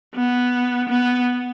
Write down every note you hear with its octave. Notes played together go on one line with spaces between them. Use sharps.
B3
B3